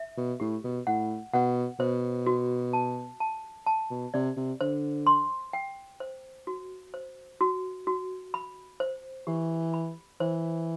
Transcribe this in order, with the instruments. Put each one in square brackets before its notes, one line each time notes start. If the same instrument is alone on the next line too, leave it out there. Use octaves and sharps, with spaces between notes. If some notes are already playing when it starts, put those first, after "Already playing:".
Already playing: [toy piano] E5
[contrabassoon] B2
[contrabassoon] A2 [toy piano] G4
[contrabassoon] B2
[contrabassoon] A2 [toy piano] F#5
[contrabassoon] B2 [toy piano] F#5
[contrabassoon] B2 [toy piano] C5
[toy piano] F#4
A5
A5
A5
[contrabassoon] B2
[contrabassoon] C3 [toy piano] D5
[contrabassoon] C3
[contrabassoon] D3 [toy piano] C5
[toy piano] C6
G5
C5
F#4
C5
F#4
F#4
B5
C5
[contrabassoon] E3 [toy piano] G4
[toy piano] B5
[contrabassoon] E3 [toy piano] C5